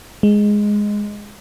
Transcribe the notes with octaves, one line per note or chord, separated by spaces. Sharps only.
G#3